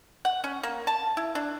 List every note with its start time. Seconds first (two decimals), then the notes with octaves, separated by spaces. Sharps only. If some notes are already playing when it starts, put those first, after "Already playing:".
0.25 F#5
0.44 C#4
0.63 A#3
0.87 A5
1.17 E4
1.35 D4